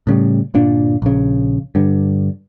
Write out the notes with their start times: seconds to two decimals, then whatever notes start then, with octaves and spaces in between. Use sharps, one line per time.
0.07 A2 C#3 G3
0.54 G1 A#2 D4
1.02 A#1 C#3
1.75 G2 D3